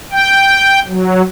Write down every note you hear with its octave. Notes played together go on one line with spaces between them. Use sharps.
G5
F#3